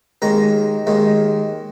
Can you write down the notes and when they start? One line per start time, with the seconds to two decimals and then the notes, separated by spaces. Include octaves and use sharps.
0.22 D#2 D#3 G#3 A#5
0.87 D#2 D#3 G#3